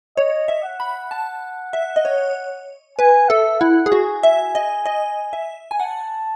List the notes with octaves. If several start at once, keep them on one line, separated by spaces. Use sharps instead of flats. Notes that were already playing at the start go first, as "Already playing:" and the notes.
C#5 D#5
E5
F#5
B5
A5
E5
D#5
C#5
B4 G#5
A4 E5
E4 F#5
G#4
F#4 G#5
E5
D#5
D#5
E5
G#5
F#5 A5